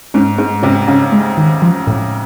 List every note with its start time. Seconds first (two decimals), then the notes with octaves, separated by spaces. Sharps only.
0.14 G#2 C#4
0.38 G#2 G#3
0.63 C3 C#4
0.87 C#3 C#4
1.12 G#3
1.38 D#3
1.62 F3
1.87 A2